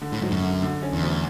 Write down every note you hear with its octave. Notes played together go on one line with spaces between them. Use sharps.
D3
A2
G#2 F#3
F#2
D3
D3
C#4
E2
D2